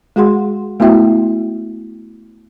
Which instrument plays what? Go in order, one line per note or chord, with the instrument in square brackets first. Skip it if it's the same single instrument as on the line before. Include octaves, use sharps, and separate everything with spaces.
[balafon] G#3 F#4 G#4 F#5 C6
A3 B3 E4 F#4 E5 G5